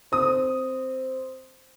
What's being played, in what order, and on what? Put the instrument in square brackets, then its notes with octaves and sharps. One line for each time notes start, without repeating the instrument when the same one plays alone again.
[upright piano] C4 D#6